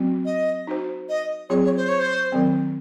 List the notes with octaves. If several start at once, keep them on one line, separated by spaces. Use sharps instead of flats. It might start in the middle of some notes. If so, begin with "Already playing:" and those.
Already playing: F#3 C4 F#4
D#5
D#4 F#4 C5
D#5
F#3 C4 F4 G#4 C#5
C#5
C5
C#5
C5
D#3 F#3 C4